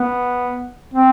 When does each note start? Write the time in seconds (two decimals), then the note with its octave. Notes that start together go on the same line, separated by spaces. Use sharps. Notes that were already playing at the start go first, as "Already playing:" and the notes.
Already playing: B3
0.94 C4